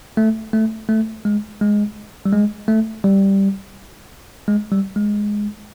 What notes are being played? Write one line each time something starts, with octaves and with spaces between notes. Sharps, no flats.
A3
A3
A3
G#3
G#3
G3
G#3
A3
G3
G#3
G3
G#3